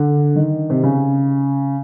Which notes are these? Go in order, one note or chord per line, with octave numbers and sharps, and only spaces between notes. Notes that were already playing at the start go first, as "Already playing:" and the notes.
Already playing: D3
D#3
C3
C#3